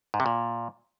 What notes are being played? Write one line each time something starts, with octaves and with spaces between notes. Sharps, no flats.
G#2
C3
A#2